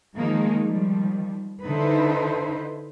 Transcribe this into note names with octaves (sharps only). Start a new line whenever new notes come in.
D#3 F3 G#3 A#3 D#4
D#3 F3 G3
D3 D#4 E4 B4 C5